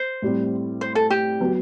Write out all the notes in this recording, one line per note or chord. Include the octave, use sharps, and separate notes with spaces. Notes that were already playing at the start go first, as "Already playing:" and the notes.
Already playing: C5
A2 G3 C4
C5
A4
G4
F#3 B3